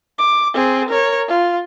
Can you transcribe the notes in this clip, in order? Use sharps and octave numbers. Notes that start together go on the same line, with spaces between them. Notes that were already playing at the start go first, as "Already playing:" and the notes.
D6
C4 G#4
A#4 C#5
F4